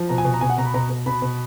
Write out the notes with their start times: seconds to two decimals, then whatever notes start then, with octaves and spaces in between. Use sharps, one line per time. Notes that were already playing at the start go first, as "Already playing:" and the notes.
Already playing: F3
0.09 B2 A#5
0.18 G#5
0.25 B2
0.34 A#5
0.41 B2 G#5
0.50 F#5
0.58 B2 A#5
0.65 B5
0.74 B2 A#5
0.90 B2
1.06 B2 B5
1.22 B2